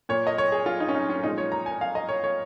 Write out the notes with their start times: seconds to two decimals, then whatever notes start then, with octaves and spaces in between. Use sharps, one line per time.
0.09 A#2 A#3 C#5
0.27 D#5
0.38 C#5
0.52 G#4
0.66 F4
0.80 D#4
0.88 C#4
0.95 D#4
1.10 C#4
1.23 A#2 F3 G#3 D#4
1.38 C#5
1.52 A#5
1.66 G#5
1.81 F5
1.95 D#5
2.09 C#5
2.24 C#5